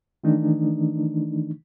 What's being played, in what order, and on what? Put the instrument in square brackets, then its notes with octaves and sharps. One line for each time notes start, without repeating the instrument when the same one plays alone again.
[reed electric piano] D#3 E3 A3 D4 D#4